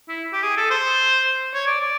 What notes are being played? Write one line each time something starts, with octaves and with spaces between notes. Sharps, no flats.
E4
G4
G#4
A4
C5
C#5
D5
D5